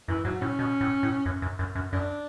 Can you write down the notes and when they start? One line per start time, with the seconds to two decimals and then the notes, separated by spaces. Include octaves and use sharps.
0.08 F#2 E3
0.25 G#2 F#3
0.41 A2 C#4
0.59 B2
0.81 A2
1.03 A2
1.26 F#2
1.42 F#2
1.59 F#2
1.75 F#2
1.92 F#2 D4